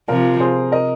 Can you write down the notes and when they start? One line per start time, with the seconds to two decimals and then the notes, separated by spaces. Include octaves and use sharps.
0.08 C3 F3 F4 A#4
0.40 G#4 C5
0.72 A#4 D#5